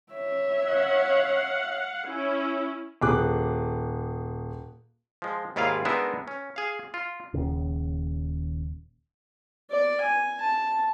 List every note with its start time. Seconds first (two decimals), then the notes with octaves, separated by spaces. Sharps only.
0.13 C#5 E5
0.67 F5 F#5
2.07 C#4 E4
3.01 D#1 G#4 D6 F#6
5.22 F3 G#3
5.56 D#2 G#2 E4 F4 G#4 F5
5.85 G#3 B3 D4 D#4 A#4 E5
6.28 C#4
6.56 G#4 F5
6.94 F4
7.34 D#1 D#2 C#3
9.71 D5
10.01 G#5
10.40 A5